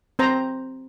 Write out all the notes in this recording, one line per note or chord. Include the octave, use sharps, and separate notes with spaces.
C4 C5 A#5